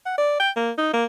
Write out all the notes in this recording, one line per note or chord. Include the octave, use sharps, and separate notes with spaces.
F#5
D5
G5
A#3
D#4
A#3